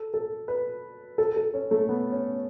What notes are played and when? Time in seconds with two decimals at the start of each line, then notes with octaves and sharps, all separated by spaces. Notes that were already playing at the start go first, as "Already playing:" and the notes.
Already playing: A4
0.14 A4
0.48 B4
1.18 A4
1.36 A4
1.54 C#4
1.71 A3
1.89 B3
2.12 C#4